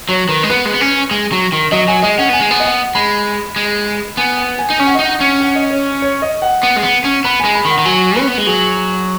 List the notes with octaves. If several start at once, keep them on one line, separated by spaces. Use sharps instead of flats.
F#3 C#5
D#3 B4
G#3
B3 B4
G#3
B3
C#4 B4
G#3
F#3
D#3
F#3 D#5
F#3 G#5
G#3 D#5
C#4 F#5
B3 G#5
G#3
B3
D#5
F#5
G#3 B5
G#3
B3 G#5
F#5
G#5
D#4
C#4 G#5
F#5
D#5
D#4 F#5
C#4
F#5
D#5
C#5
C#5
D#5
F#5
B3
G#3
B3
C#4
B3 B5
G#3 G#5
B5
D#3
F#5
D#3
F#3 G#5
C#4 B4
B3
G#3
F#3 G#4